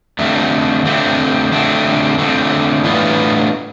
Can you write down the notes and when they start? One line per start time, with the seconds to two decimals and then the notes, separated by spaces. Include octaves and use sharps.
0.19 F2 D3 A3 C4
0.85 F2 D3 A3 C4
1.52 F2 D3 A3 C4
2.18 F2 D3 A3 C4
2.84 A2 E3 B3 D4 F4